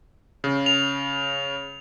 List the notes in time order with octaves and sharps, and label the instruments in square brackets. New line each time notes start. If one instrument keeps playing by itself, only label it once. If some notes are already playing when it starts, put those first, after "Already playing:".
[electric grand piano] C#3
[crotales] F7